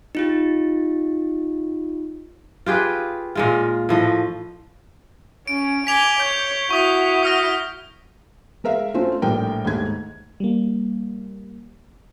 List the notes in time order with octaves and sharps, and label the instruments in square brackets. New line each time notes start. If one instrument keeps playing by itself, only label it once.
[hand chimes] D#4 F4 G4
[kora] F4 G4 G#4 B4
A#2 G#3 F4
A2 F3 D#5
[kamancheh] C#4 [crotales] D7
[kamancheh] G#5 D6 [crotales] B6 F7 G7
[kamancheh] C#5 [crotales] G6
[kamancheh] E4 F#4 [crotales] C#6 D#6 B6
[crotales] D#6 F6 A#6
[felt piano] G#3 A#4 E5 F5
A3 C4 C#4 F4
A#1 A2 G3 A#4 G5
D#2 G#2 A3 G#6
[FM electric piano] G3 A#3